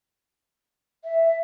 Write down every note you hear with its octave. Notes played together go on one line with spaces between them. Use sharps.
E5